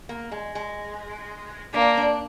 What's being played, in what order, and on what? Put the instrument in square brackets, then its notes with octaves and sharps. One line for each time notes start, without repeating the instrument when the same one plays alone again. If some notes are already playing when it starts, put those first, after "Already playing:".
[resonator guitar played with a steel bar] A#3
G#3
G#3
[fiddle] A#3 [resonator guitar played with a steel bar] D4
[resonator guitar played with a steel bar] D4